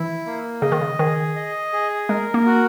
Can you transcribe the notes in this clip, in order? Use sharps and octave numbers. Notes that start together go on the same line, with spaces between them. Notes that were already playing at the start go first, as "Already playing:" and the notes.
Already playing: E3 E4
A#3
C#3 D#5
D#3
C#3
D#3 G#4
D#5
G#4
G#3 A#4
A#3
F#4